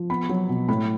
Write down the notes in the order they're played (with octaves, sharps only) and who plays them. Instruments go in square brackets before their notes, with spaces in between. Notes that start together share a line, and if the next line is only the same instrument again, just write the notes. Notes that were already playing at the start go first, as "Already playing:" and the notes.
Already playing: [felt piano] F3
B3 B5
F#3
B2
A2 B5